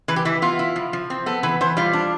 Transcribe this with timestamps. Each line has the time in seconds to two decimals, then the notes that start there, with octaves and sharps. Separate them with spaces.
0.08 E3 B4
0.16 G4
0.25 E3 E4
0.42 B3 F4
0.59 E4
0.76 F3
0.93 F3
1.10 C4
1.26 B3 A4
1.43 E3 B4
1.61 E3 C5
1.77 G3 F4
1.93 D4